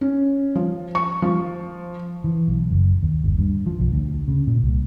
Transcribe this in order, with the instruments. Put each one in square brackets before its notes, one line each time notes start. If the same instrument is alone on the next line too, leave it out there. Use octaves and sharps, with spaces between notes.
[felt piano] C#4
F3
C#6
F3
[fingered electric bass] E3
B1
F#1
D#2
G1
G2
F3
B1
D2
C#3
A#2
C2